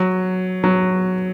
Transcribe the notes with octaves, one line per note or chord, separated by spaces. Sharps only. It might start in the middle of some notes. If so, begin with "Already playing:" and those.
Already playing: F#3
F#3